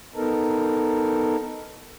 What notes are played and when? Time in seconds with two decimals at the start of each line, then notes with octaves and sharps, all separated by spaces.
0.15 B3 D#4 A4 A#4